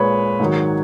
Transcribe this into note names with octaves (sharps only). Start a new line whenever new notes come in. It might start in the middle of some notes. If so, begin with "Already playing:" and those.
Already playing: A#2 G#3 B4 C#5
G#2 D#3 F#3